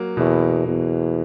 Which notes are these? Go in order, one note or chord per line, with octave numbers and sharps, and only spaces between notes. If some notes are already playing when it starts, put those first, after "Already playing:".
Already playing: F#3 A#3
E2 B2
E2